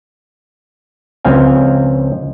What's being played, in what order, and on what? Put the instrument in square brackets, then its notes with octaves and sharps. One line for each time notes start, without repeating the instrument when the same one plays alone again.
[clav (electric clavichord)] C#2 F3 C4 F5 G#5